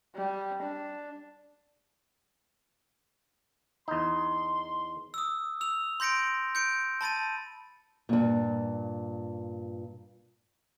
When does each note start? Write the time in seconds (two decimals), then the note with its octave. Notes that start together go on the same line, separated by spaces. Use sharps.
0.16 G3
0.62 D4
3.88 E2 D#4 C6
5.14 D#6 E6
5.61 E6 F7
6.00 C6 G6 A#6 C#7 D7
6.55 G6 C#7 D7
7.01 A5 B5 A6 D#7
8.09 G2 A#2